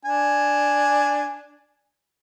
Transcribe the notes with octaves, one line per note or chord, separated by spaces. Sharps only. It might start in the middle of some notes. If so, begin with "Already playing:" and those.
D4 G#5